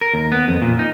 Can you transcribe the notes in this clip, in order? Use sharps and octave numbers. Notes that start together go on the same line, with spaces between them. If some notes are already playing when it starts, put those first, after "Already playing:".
A#4
D#2
B3
F2
A#2
D#4